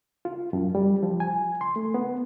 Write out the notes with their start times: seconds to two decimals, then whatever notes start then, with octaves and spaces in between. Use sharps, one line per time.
0.25 F4
0.53 F#2
0.75 G3
1.03 F3
1.20 G#5
1.61 C6
1.76 A3
1.94 B3